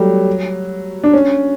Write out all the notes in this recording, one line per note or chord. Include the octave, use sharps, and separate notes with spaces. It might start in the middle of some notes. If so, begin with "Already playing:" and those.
Already playing: F#3 G3 A3
D4
C#4